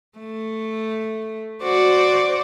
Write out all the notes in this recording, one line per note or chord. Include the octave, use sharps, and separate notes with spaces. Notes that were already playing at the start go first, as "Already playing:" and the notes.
A3
F#4 C5 D5